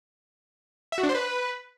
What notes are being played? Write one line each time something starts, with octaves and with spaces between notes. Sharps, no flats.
E5
F#4
D4
C5
B4